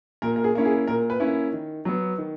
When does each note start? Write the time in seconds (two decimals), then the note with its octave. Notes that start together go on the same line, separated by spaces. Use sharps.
0.22 A#2 A#4
0.36 A#4
0.44 G#4
0.55 A#3 C#4 E4
0.65 G#4
0.87 A#2 A#4
1.10 B4
1.20 A#3 C#4 E4
1.53 D#3
1.85 F#3 B3
2.18 D#3